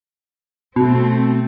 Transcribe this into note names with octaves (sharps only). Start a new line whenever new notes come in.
B2 A3 C4